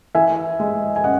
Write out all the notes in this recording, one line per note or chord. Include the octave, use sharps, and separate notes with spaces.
E3 E5 G#5
G#3
G#5
C#4 D#5 F#5